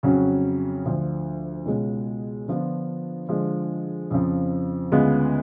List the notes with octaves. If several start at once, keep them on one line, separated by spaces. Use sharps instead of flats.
F2 C#3 F#3 C#4 F#4
D2 D3 F3
C#2 B2 G#3 C#4
D3 F3 B3 D4 F4
D3 F3 G#3
F2 C#3 F3
D2 C#3 G#3 B3 F4